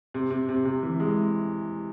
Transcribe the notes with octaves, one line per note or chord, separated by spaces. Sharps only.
C3
C3
C3
C3
E3
G#3